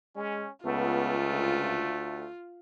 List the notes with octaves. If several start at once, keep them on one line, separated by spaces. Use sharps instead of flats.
G#3 C#4
C#2 A3 B3 F4
D2